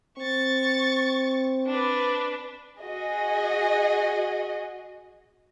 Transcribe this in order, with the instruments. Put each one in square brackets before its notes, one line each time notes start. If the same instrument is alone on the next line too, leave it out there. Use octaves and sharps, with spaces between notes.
[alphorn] C4 [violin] C#6 A6
[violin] D4 B4
[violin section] F#4 G#4 D#5